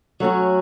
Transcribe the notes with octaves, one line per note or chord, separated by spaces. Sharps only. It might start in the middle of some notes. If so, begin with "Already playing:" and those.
F#3 A3 C#4 F#4